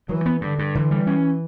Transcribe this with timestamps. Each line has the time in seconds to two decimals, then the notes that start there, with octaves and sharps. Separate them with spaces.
0.09 E3 F#3
0.26 B3
0.41 G2 D3
0.59 G2
0.75 D3 E3
0.91 G3
1.07 C#4